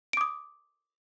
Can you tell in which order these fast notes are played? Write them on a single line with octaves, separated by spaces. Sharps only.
D7 D6 D#6